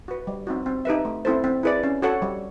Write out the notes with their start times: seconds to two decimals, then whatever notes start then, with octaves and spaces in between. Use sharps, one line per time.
0.08 F#4 B4
0.27 G3
0.47 C4 D#4 F#4
0.66 C4
0.85 D#4 G4 B4 E5
1.05 A3
1.25 C4 E4 A4 C5
1.44 C4
1.63 E4 G#4 B4 D5
1.83 C#4
2.02 F#4 A4 C#5 F#5
2.22 G3